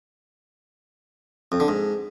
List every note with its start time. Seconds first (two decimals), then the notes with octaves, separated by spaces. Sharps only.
1.52 F2
1.60 D3
1.68 G#2